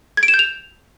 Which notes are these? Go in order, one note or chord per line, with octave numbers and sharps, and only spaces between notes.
G#6
D7
E7
G6
F7